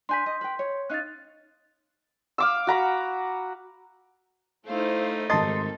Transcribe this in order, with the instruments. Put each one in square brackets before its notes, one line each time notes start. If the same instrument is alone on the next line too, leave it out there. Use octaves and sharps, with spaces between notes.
[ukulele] D4 G#5 B5 [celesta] C6 G6 B6
[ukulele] D#5
B4 G5
C#5
[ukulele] C#4 D#4 F5 [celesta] F#6 A6
[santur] F5 D6 E6
F#4 A#5 B5
[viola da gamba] A3 D#4 [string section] E4 C5 F5
[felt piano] G#1 A5 A6 [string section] G4 A4 A#4 [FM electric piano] D#5 C6